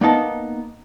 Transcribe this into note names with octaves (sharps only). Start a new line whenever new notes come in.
A#3 B3 D#4 A5